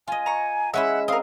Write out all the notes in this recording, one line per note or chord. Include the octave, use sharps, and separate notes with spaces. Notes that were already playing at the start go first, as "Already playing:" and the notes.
F4 D#5 G#5
A#5 C#6
G#3 C#4 E4 E5 F#5
C4 A#4 F5 D#6